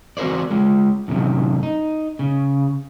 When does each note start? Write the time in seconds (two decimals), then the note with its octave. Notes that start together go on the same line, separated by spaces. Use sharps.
0.17 C4 F#4 A#4 C5 D5
0.51 G#3 F4
1.08 F#2 A2 C3 D#3
1.63 D#4
2.19 C#3